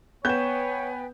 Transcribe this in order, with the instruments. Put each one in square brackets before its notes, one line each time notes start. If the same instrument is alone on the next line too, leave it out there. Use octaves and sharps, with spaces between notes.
[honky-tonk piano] B3 [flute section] B4 G5 G#5 [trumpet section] C#5 [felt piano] G6 E7